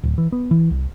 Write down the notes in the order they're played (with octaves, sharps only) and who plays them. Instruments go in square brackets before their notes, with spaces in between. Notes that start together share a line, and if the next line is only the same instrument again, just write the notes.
[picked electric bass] D1
E3
B3
E3
C2